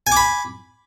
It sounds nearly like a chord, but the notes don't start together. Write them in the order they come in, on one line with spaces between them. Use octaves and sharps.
G#5 D6 B5